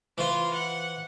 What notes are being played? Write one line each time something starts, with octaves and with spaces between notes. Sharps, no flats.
E3 F4 C5
F#5